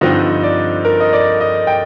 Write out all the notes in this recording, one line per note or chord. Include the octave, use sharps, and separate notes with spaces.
G2 D3 F3 C4 D#4 D#5
D5
A#4
D#5
D5
D#5
G5